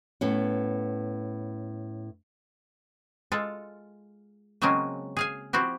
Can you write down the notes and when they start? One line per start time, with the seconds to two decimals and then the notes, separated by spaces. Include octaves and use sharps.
0.21 A2 B3 C#4
3.32 G#3 F4 A4
4.62 C#3 F#3 G#3 A#3 C4 C#4
5.17 G#4 F5 G#5
5.53 F3 C4 E4 F#4 G4